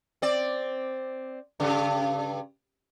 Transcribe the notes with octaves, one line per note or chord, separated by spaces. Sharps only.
C4 D5
G2 C#3